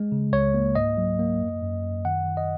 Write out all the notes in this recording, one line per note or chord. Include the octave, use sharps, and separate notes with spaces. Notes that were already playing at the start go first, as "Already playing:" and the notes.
Already playing: G#3
C#3
C#2 C#5
A#3
G#2 D#5
F#3
A#3
F#2
F#2
F#2
D#3 F#5
D#3
D#5